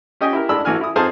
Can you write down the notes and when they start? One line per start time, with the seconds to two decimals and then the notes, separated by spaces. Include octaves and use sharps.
0.21 C#4 G4 D#5 G5 G#5 D#6
0.33 E4 G4 A#4
0.49 A1 G#3 D4 B5 E6
0.65 A1 E3 F#4 G#5 F6
0.81 E4 D#6
0.96 F2 D#4 G#4 C5 F5 A5